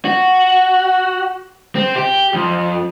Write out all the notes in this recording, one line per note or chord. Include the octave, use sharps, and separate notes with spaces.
F#4
C4
G4
F2